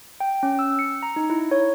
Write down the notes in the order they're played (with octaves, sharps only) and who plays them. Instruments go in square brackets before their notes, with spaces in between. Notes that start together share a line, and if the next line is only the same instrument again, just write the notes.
[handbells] G5
C#4
E6
C#7
A#5
D#4
E4
C#5